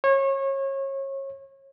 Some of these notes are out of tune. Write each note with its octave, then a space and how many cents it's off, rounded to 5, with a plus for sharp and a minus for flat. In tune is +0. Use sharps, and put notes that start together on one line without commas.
C#5 -30